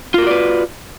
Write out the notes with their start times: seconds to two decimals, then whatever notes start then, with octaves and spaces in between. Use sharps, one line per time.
0.14 F4
0.18 A#4
0.22 F#4
0.27 D5
0.31 B4